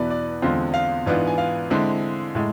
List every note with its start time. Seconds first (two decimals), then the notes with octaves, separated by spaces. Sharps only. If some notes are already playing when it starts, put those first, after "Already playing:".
Already playing: E2 B2 B3 E4 B4 D5
0.10 D5
0.42 E2 D3 G#3 C4 F4
0.74 F5
1.06 G#2 E3 B3 D4 F4
1.27 G#5
1.38 F5
1.70 D3 G#3 C4 E4
2.35 A2 G#3